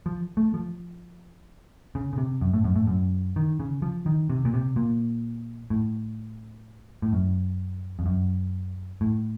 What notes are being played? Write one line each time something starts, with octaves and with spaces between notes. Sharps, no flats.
F3
A3
F3
C#3
C#3
C3
F#2
A2
F#2
A2
F#2
D#3
C#3
F3
D#3
C3
A#2
C3
A#2
A2
A2
F#2
F2
F#2
A2